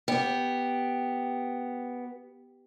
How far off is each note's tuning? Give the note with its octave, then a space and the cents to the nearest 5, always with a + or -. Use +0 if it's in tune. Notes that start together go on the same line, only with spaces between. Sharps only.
B3 +0 G4 +0